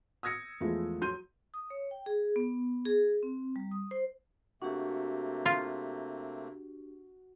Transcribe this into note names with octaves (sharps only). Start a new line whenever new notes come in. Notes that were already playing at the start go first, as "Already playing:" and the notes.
D#6 E6 G#6 A#6 C#7
E2 F3 G#3 A3 E4 F4
F#3 C6 G6 D#7
D#6
C#5
G5
G#4
B3
G#4
C4
G3
D#6
C5
C3 A3 A#3 D4 F#4 G4
F4